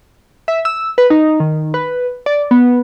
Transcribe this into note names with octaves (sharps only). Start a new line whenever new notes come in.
E5
E6
B4
D#4
D#3
B4
D5
B3